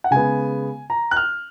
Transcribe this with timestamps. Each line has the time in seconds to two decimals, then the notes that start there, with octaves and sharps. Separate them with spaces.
0.04 F#5
0.11 C#3 G#3 B3 G#5
0.90 A#5
1.11 F#6
1.16 F6